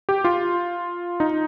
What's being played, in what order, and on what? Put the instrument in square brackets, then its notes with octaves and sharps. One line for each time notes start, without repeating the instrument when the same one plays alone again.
[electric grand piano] G4
F4
D#4